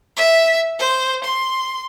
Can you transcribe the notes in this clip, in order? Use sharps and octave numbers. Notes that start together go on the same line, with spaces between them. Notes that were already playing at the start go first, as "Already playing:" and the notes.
E5
C5
C6